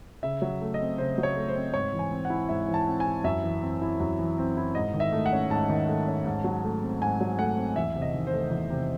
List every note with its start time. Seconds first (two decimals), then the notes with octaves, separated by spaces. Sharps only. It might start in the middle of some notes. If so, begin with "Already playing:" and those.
0.23 C#3 E5
0.42 F#3
0.61 A3
0.74 D#5
0.81 C4
0.98 C#3 C5
1.18 F#3
1.23 C#5
1.36 A3
1.48 C5
1.56 C4
1.74 G#2 C#5
1.93 E3
1.99 G#5
2.11 C4
2.25 F#5
2.30 E4
2.49 G#2 E5
2.68 E3
2.74 A5
2.87 C4
3.00 G#5
3.06 E4
3.24 F#2 E5
3.43 E3
3.62 C4
3.82 E4
4.00 F#2
4.19 E3
4.38 C4
4.57 E4
4.75 G#2 D#5
4.94 D#3
5.00 E5
5.12 A3
5.26 F#5
5.32 C#4
5.50 G#2 A5
5.70 D#3
5.88 A3
6.07 C#4
6.26 G#2
6.44 F#3
6.64 A3
6.82 C4
7.02 G#2 G#5
7.21 F#3
7.38 A3 F#5
7.57 C4
7.76 E2 E5
7.96 C3
8.02 D#5
8.14 D#3
8.27 C5
8.33 A3
8.51 E2
8.70 C3